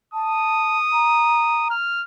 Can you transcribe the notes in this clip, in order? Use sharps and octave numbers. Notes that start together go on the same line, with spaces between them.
A5 D#6
A#5
F6